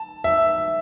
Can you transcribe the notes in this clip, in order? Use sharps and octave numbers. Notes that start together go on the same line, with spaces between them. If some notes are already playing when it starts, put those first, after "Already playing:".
Already playing: A5
E5